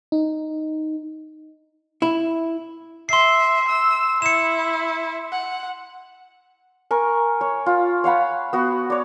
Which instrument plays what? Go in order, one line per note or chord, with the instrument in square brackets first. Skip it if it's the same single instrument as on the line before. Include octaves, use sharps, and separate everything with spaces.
[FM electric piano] D#4
[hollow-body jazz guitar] E4
[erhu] E5 [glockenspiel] C6 C7
[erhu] E6
[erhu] E4 [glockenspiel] C#7 E7
[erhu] F#5
[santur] A#4 G#5 C#6
C#5
F4
C#5 F5 F#5 B5
B3 F#4
C#5 D5